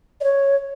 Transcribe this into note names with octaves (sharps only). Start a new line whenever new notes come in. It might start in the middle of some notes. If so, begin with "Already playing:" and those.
D5
C#5